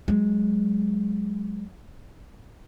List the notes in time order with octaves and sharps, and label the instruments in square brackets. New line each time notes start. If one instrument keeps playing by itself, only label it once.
[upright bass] F#3 G#3